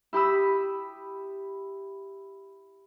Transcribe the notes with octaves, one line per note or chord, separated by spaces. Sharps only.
E4 G4 B5 D#6 E6